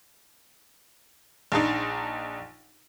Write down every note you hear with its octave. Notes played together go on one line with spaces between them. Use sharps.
A#1 D4 D#4